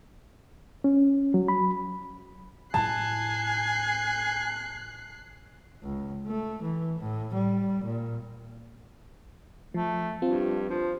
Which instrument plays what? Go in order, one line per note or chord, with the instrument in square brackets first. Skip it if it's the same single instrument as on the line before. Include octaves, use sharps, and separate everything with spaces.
[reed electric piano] C#4
F#3
B5
[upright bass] A2 E4 [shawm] G#5 [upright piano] A5 [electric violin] F#6 C7
[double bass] C#2
A3
E3
A2
G3
A#2
[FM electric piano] F3 [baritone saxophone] A3
[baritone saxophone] G2 [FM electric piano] C4 F4
[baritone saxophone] F3